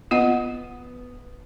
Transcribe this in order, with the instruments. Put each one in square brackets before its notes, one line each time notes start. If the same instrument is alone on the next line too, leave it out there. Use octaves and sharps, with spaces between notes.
[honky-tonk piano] B3 [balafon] F4 D#5 F#5